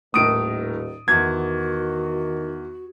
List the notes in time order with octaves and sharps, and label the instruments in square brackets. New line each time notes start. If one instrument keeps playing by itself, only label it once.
[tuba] D#1 [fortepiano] A2 D#3 [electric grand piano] D#6 D7
[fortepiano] E2 [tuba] D#3 [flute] F#4 [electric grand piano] G#6